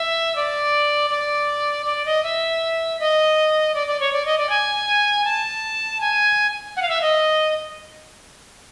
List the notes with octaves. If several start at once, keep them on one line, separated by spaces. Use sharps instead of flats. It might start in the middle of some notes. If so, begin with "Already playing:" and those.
Already playing: E5
D5
D5
D5
D#5
E5
D#5
D5
D5
C#5
D5
D#5
D5
G#5
A5
G#5
F#5
F5
E5
D#5